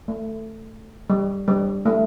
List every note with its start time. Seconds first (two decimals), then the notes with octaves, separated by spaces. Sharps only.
0.08 A3
1.10 G3
1.48 G3
1.86 A3